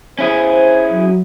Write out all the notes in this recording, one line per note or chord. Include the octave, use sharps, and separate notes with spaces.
C#4 E4 G#4 C5
F#3